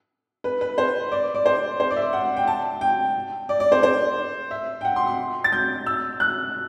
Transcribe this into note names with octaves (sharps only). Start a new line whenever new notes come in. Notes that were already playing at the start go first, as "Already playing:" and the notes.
B4
B4
C5
D5
D5
C5
C5
D5
E5
F#5
G5
A5
G5
D5
D5
C5
C5
E5
G5
F#5
C6
C6
A6
G6
E6
F#6